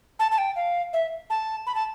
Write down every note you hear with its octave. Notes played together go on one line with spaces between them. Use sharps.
A5
A5
G5
F5
E5
A5
B5
A5